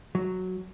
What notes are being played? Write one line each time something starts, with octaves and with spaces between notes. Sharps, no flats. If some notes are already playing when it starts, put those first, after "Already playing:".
F#3